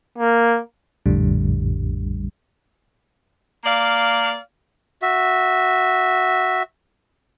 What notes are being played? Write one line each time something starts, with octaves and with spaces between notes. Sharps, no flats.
A#3
A#1 F2 A2 D3 G3
A#3 D5 F5
F#4 E5